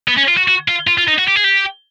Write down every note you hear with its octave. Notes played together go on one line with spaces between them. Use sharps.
B3
C#4
F4
F#4
F#4
F4
F4
F4
D#4
F#4
G4
G#4
G4